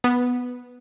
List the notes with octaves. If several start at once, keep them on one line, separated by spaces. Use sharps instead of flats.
B3